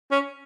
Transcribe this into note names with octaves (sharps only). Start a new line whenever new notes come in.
C#4